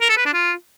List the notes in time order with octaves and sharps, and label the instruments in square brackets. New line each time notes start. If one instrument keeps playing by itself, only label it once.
[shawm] A#4
A4
B4
D4
F4